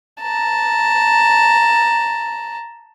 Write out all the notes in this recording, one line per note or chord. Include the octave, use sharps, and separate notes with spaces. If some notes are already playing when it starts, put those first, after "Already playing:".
A5 A#5